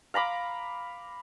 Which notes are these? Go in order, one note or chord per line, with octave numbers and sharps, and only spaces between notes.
F5 A#5 B5 D6